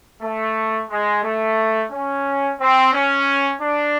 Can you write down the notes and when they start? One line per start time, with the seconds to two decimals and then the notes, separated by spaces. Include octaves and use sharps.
0.22 A3
0.90 G#3
1.23 A3
1.92 C#4
2.60 C4
2.93 C#4
3.61 D4